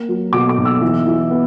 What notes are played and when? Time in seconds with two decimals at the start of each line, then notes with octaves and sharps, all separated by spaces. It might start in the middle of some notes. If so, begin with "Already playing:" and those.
Already playing: A#3
0.09 F#3
0.33 B2 D6
0.49 D6
0.58 B1
0.65 E6
0.81 E3
1.06 E3
1.31 B3